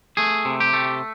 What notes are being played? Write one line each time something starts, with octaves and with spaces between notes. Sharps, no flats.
A3 G#4
C3
G4
A3